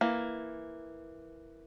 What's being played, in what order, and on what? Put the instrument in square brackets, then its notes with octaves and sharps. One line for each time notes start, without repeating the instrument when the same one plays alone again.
[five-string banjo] E3 A#3